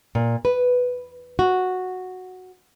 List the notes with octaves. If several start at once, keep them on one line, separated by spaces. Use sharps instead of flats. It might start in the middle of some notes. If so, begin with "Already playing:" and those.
A#2
B4
F#4